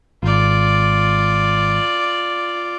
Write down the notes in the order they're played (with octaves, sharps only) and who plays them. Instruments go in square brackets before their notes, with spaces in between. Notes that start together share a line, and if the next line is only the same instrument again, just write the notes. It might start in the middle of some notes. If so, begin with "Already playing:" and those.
[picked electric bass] G#1 [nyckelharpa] F4 D5